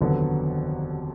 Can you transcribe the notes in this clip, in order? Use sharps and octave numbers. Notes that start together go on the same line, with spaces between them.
F1 D#2 D3 F#3 B3